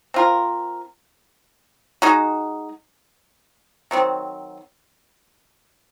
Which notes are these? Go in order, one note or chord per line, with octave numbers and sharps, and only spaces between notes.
C4 F4 A#4
G#3 D#4 F#4
D#3 F#3 C4